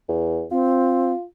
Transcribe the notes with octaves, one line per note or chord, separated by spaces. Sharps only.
E2
C4 F4